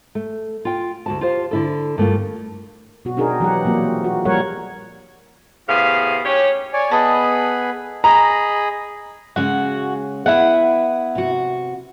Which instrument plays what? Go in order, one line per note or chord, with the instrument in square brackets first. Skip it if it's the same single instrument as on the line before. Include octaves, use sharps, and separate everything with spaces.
[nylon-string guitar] A3
F4 G5
D2 F#4 A5
F4 G4 C5 F5
D3 E4 A4
G2 A3 A#3 F4
[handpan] B2 F#4
C4 D4 D#4 G#4 A#4
E3 F#3 G4 F#5
A#2 F3 F#3 A#3 C4
F#4
A#2 F3 G3 A#4 C#5 F#5
[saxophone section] A2 C3 B3 G#4 F5
D#2 C#4 G4 C#5
[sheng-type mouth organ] C#5 D5 G#5
[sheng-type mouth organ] B3 G#4 B5 [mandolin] A4 D#5
[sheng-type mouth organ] G#4 D#5 B5 [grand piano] A#5
[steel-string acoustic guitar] C#3 G#3 C#4 [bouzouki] F#4
[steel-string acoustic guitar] B3 [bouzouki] E4 F#5
[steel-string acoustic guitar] C3 F#4